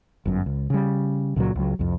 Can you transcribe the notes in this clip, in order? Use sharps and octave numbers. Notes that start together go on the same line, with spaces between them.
G1 F#2
C#2
C#3 G3
C#2 A#2 C#3 F#3
C#2 F#3
C2 F2